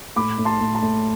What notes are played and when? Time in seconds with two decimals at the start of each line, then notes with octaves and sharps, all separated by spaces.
0.16 A2 B5 D6
0.38 A2
0.45 A5 C6
0.60 A2
0.75 A5
0.82 A2